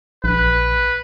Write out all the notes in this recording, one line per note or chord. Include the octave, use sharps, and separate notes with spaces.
A#1 B4